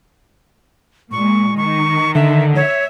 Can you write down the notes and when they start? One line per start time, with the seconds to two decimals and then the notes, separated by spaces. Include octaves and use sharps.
1.12 A#2 G#3 C#6
1.57 D#3 C#6
2.15 D3 E5
2.56 C#5 E5